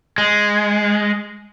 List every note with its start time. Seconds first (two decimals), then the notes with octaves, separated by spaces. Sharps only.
0.18 G#3